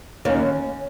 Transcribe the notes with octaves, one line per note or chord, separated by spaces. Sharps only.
D#2 C#4